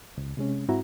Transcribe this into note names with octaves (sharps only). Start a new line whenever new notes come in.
C#2
C3 G#3 C#4
G#2 C4 E4 F#4 A#5